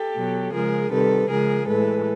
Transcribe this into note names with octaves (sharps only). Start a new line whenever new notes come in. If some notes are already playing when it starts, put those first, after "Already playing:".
Already playing: G4 A4
B2 F#3
C#3 F3 G#3 G#4 A#4
C3 D#3 G3 A4 B4
C#3 F3 G#3 G#4 A#4
A2 E3 G#3 A4 B4